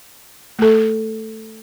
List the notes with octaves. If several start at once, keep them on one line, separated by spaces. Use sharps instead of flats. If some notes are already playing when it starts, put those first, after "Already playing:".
A3 A4